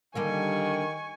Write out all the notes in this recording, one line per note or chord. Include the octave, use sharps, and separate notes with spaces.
D3 D#3 G3 A#3 G#5 C#6